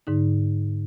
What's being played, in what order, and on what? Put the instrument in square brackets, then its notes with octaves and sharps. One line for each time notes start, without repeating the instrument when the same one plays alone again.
[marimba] G#2 D3 D#4